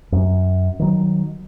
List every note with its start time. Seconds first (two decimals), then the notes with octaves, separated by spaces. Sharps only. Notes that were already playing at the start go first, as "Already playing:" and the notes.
0.12 F#2
0.79 D#3 F#3